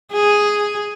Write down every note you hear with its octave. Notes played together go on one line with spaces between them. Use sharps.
G#4